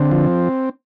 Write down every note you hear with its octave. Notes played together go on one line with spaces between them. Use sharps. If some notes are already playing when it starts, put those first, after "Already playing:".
Already playing: D3 C4
F3